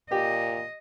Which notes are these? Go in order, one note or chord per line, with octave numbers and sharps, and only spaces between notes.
A#2 G4 D#5